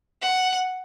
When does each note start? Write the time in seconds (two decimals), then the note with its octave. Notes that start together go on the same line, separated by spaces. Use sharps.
0.22 F#5